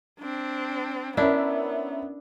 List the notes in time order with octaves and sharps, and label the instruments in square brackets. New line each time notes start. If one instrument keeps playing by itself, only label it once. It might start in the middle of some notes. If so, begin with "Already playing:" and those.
[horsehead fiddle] C4 D4
[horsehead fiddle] B3 [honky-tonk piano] C#4 A#4 E5 [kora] D4 E4